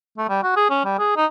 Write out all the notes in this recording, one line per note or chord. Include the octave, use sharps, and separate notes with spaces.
A3
G3
F#4
G#4
C#4
G3
G#4
D#4